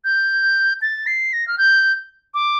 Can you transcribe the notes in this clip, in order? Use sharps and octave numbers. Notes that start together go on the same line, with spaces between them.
G6
A6
C7
A#6
F6
G6
D6